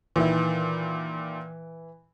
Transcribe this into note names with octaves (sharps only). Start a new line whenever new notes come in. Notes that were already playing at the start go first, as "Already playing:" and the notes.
A#2 D#3 E3 E4